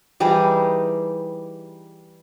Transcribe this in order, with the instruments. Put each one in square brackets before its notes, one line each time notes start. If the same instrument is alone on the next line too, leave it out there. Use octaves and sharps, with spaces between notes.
[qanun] E3 G3 D#4 G#4